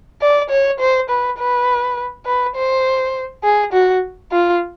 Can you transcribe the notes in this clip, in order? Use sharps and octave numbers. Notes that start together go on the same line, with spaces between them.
D5
C#5
C5
B4
B4
B4
C5
G#4
F#4
F4